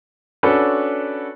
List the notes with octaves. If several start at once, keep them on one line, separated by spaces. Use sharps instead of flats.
C#4 D4 F#4 A4 B4